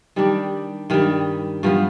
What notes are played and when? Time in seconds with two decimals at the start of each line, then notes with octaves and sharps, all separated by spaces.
0.16 D#3 G3 D4 G4
0.90 G2 D#3 G3
1.63 G2 F3 B3